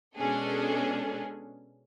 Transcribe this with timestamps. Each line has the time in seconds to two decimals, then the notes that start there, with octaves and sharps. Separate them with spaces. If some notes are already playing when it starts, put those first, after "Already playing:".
0.16 B2 G#3 C#4 D4 G#4 A4